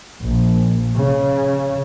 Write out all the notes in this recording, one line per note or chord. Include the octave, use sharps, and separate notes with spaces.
A#1
C#3